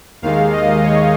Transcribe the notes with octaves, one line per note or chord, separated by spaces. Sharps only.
D#2 D#3 G#3 F5
D#5
C#5